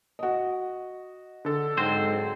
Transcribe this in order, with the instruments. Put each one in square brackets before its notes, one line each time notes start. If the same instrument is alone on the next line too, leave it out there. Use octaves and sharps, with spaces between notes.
[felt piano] F#4 D#5
[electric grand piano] D3 A4
[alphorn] G#2 [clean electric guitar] F#3 C4 C5